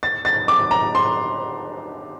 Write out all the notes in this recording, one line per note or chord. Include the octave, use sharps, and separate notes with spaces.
A6
A6
D6
A#5
C6